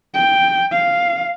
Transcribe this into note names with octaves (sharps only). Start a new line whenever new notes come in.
G5
F5